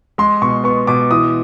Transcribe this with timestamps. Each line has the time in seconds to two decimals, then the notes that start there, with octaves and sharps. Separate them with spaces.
0.18 G#3 C6
0.42 B2 C#6
0.64 B3 C#6
0.87 B2 D6
1.10 E3 D#6